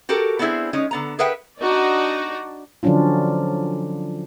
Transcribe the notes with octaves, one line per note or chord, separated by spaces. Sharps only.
F#4 G4 A4 A#4
B3 C4 D4 E4 G#4 C5
G#3 C#4 D#4
D3 B3 A#5
G#4 A#4 B4 E5 F#5 G5
D4 D#4 F#4 D5
D3 F3 F#3 C#4 D4 F4